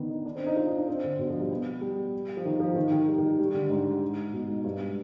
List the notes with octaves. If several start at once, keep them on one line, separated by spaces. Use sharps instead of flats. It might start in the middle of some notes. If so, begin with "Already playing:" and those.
Already playing: D3 D#3 B3
D#4
D4
C4
D#4
F4
D#4
D4
C4
D3
B2
F3
G3
B3
G3
F3
D#3
F3
D#3
D#3
G3
D#3
G3
D3
G#2
B2
G#2
G2